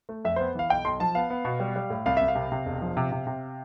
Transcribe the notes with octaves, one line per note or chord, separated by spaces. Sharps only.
A3
F2 E5
B3 C5
E3 F5
B1 G5
B1 C6
F3 A5
B3 F5
B3
B2
G3
G3
A2
C2 F5
C2 E5
F5
C3
C3
E1
F3
C3
C3
C3